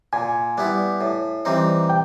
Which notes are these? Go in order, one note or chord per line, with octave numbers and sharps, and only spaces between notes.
A#2 G#5
G3 B3 E4
A2
E3 G3 C4 D#4
G5